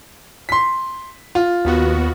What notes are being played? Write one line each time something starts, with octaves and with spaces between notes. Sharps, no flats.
C6 B6
F4
D#2 B3 F#4